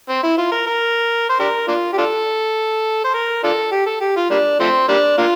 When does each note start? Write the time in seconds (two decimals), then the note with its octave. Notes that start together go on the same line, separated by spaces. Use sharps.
0.09 C4
0.23 E4
0.38 F4
0.52 A#4
0.67 A#4
1.29 C5
1.39 D4 G4 A#4
1.68 A#3 D4 F4
1.93 G4
1.98 D4 F4 A4
3.04 C5
3.14 A#4
3.43 D4 F4 A4
3.71 G4
3.86 A4
4.01 G4
4.16 F4
4.30 G3 A#3 D4
4.60 F3 A3 C4
4.88 G3 A#3 D4
5.18 A#3 D4 F4